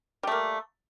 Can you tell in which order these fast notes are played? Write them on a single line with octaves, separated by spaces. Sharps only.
G3 A3 A#3